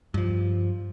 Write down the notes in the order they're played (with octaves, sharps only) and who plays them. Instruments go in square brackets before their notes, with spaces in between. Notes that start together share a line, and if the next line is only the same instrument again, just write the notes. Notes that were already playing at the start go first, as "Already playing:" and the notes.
[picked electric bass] G2 F3